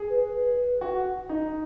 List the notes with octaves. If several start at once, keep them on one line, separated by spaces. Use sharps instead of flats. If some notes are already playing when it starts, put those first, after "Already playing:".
Already playing: G#4
B4
B4
F#4
D#4